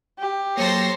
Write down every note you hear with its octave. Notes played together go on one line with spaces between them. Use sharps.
G4
F#3 A#3 A4 C5 C#5 A#6 C7